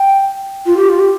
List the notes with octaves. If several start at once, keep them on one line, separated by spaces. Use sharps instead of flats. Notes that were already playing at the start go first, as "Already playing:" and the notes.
Already playing: G5
F4
G4
F4
G4